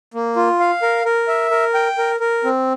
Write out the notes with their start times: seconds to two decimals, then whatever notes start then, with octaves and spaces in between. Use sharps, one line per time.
0.14 A#3
0.36 F4
0.60 F5
0.82 A#4
1.05 A#4
1.28 E5
1.51 A#4
1.74 G5
1.98 A#4
2.20 A#4
2.44 C4